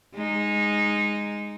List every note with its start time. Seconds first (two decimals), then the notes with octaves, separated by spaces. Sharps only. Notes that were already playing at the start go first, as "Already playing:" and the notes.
0.15 G#3 D#4